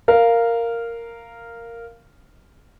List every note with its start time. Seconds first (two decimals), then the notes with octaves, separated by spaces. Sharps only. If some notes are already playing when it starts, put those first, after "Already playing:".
0.08 A#4 F5